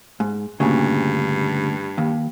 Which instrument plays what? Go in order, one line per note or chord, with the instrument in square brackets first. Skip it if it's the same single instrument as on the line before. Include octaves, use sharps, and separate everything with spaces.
[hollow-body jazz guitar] G#2
[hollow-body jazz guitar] D2 A#2 C#3 [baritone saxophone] G2
[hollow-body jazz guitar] D#2